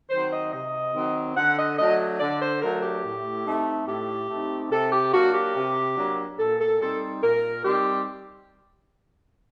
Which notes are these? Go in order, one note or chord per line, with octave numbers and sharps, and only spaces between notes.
D#3 F#3 C4 C5
D#5
C3 D#5
D#3 F#3 C4
D3 F#5
D#5
F#3 A3 D4 D#5
D3 D5
C5
F#3 A3 D4 A#4
G4
A2
A3 C4 D#4
A2 G4
A3 C4 D#4
C3 A4
G4
F#3 A#3 D4 F#4
G4
C3
F#3 A#3 D4
A#2 A4
A4
G3 C4 D#4 A4
A#2 A#4
G3 C4 D#4 G4